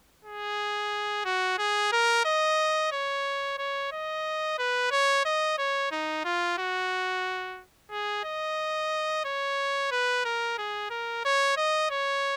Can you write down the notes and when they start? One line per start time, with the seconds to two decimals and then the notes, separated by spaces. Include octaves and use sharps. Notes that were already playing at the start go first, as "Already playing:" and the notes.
0.25 G#4
1.25 F#4
1.58 G#4
1.92 A#4
2.25 D#5
2.92 C#5
3.58 C#5
3.92 D#5
4.58 B4
4.91 C#5
5.25 D#5
5.58 C#5
5.92 D#4
6.25 F4
6.58 F#4
7.91 G#4
8.24 D#5
9.25 C#5
9.91 B4
10.25 A#4
10.58 G#4
10.90 A#4
11.25 C#5
11.57 D#5
11.90 C#5